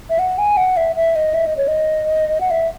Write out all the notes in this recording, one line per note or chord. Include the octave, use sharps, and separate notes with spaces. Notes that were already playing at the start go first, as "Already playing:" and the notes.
E5
F#5
G#5
F#5
E5
E5
D#5
E5
D#5
C#5
D#5
F#5
E5